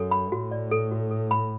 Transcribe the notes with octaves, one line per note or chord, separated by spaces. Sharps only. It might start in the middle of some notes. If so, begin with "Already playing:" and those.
Already playing: F#2 A4
B5
A2 F#4
D5
A4
F#4
A4
B5